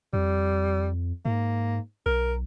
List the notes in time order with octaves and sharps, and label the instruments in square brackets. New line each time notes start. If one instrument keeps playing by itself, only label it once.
[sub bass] F2 [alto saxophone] G3
[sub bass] G#2 [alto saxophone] A#3
[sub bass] B1 [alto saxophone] A#4